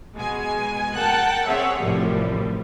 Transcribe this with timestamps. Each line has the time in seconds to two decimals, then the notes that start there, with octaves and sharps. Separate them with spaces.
0.16 B2 G#3 G#5
0.94 A#4 F#5 G5 A5 F#6
1.46 C4 G#4 C#5 E5 F#5
1.79 A1 F#2 A2 C3 F3 G3